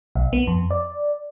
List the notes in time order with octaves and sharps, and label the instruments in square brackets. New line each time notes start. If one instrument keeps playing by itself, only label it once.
[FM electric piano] B1
B3
F2
D5